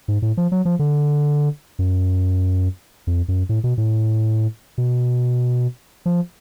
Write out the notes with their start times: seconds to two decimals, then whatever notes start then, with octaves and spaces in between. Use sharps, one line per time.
0.08 G#2
0.22 A2
0.37 F3
0.52 F#3
0.65 F3
0.79 D3
1.79 F#2
3.07 F2
3.28 F#2
3.49 A2
3.64 B2
3.78 A2
4.78 B2
6.06 F3